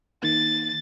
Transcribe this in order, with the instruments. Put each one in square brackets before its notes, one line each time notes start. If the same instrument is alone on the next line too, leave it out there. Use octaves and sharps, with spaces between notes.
[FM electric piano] D#3 A#3 [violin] A6